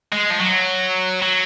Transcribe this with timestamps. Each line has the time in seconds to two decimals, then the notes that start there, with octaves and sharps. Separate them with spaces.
0.12 G#3
0.30 F3
0.40 F#3
1.22 F#3